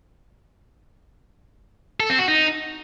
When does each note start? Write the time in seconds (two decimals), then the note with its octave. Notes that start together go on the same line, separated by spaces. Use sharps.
2.00 A4
2.10 C4
2.19 F#4
2.28 D#4